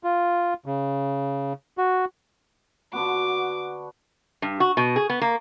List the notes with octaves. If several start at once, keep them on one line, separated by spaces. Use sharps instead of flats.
F4
C#3
F#4
D3 B3 F#4 D6
G2
F#4
B2
G#4
B3
A#3